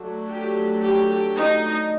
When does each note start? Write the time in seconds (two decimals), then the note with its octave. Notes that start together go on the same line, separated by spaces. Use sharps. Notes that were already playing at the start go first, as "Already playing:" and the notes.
Already playing: F#3 A3 D4
0.27 G4
0.80 G4
1.34 D#4